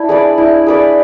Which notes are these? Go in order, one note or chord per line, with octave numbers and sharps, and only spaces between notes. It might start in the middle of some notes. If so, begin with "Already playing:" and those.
Already playing: D4 E4
G#4 B4 D5
E4
G#4 B4 D5